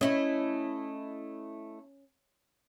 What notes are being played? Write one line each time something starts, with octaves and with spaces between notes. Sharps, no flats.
A3 C#4 E4 D#5